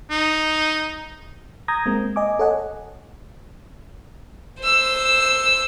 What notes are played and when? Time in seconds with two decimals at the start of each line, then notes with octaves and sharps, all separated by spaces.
0.11 D#4
1.68 A#5 D#6 G6 G#6 A#6
1.86 G#3 A#3 C4
2.16 D#5 G#5 D6
2.39 A4 C#5 D#5 F#5 G#5
4.60 C5 E6